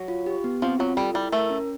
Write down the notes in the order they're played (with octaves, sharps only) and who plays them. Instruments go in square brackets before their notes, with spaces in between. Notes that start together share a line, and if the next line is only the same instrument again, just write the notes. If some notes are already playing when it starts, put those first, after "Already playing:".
Already playing: [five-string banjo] F#3
[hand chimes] F4
G4
B3
[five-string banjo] F3 [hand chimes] C4
[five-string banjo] F#3 [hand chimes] F4
[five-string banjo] G3 [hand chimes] A4
[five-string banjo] G3 [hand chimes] E4
[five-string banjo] A3 [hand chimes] A#4
[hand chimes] C#4